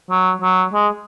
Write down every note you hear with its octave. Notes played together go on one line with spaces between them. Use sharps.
F#3
F#3
G#3